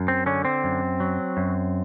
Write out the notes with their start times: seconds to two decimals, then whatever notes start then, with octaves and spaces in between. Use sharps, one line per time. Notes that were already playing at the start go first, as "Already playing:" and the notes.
Already playing: F#2
0.08 C4
0.26 D3 C#4
0.45 C4
0.64 F#2
1.00 F#3
1.37 F#2